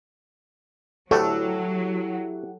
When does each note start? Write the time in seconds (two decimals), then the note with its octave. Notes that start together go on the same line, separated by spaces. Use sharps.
1.11 D2 A2 F#3 A3 E4 G4 A4 F#5